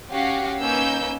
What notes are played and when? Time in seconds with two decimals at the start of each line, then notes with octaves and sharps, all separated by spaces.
0.10 C#4 F#4 G4 F5
0.60 A#3 C#4 D#4 B4 E6 G6